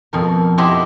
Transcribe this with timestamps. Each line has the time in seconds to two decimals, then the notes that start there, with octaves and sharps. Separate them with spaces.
0.13 F2 B2 A#4
0.58 E4 F#4 G4 C5 D#5 E5